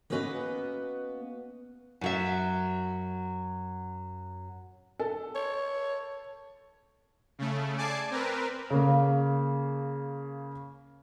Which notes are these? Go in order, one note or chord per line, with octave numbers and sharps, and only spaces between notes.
A#3 B3 C#4 F#4 B4 D#5
F#2 F#3 E5
A4
C#5
C#3 A3
D5 G#5 A5 D6 C7
C4 A#4 B4
C#3 A#3